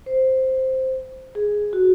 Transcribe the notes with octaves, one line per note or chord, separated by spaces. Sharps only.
C5
G#4
F#4